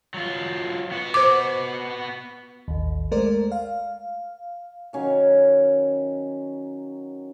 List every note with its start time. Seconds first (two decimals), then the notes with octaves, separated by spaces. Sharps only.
0.14 F#3 F4
0.92 B3 F#4
1.14 C5 D6
2.68 A1 D#2
3.11 G#3 A3 A#4 C5 D5
3.52 F5
4.93 D#3 F#3 C#4 F5